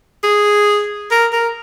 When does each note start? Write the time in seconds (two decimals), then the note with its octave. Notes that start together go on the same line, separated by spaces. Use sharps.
0.23 G#4
1.11 A#4
1.32 A#4